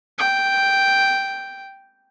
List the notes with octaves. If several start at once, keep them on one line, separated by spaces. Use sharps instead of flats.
G5